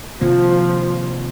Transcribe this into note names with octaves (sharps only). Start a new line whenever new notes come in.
C3 D#3 F3 A#3